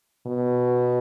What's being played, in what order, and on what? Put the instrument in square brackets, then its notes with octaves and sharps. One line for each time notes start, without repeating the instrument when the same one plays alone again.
[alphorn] B2